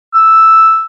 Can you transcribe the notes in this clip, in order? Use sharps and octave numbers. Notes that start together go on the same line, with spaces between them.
E6